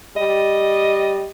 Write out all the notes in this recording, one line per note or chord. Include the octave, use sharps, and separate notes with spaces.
G3 D#5